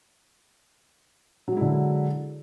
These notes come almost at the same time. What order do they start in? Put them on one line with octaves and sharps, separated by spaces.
F#3 G#3 E4 D3